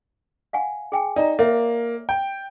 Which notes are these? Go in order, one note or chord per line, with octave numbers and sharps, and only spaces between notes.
F5 F#5 G#5
G#4 G5 G#5
D#4 D5 A#5
A#3 C#5 E5
G5